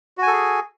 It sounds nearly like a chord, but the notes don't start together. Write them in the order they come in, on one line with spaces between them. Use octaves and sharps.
F#4 G#5 A4 G#4